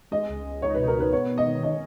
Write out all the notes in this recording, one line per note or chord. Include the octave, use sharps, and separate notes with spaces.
G#3 D#5
C#2
C#2
D#4 C#5
B4
B2
A#4
B2 B4
B3 C#5
D#3
D#5
D#3
C#4 D#5